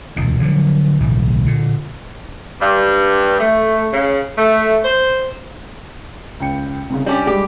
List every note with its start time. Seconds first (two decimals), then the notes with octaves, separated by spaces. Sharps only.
0.16 E1 D2 A#2
0.41 D3 F3 F#3
1.00 D1 B1 A2 E3
1.46 A#2 D3
2.60 G2
3.38 A3
3.92 C#3
4.37 A3
4.83 C5
6.40 C#2 G5 C#7
6.90 C2 C#3
7.06 G3 C#4 D4 G4 D5 D6
7.27 G3 G#3 G4